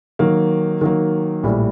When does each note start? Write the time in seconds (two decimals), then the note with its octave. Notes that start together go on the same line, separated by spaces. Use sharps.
0.19 D#3 F#3 A#3
0.81 D#3 F#3 A#3
1.43 A#1 A2 G3